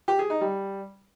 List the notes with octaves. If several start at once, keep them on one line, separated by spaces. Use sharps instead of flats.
G4
G#4
D#4
G3